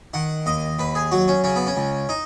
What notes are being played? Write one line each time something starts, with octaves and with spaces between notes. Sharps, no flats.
D#3 F#5
D#2 D#5
D#2 B4
G#4
F#3 F#4
C#4
C#3 C#4
B3
C#4
C#2
D#4